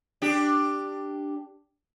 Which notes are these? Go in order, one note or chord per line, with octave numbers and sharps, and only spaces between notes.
D4 G4